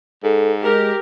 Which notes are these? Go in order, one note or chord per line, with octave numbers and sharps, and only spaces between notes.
G#2 A4
G#3 G4 A#4